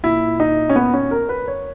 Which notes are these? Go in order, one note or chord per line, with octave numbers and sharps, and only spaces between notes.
A#2 E4
D#4
C#4
B3
C#4
A#4
B4
C#5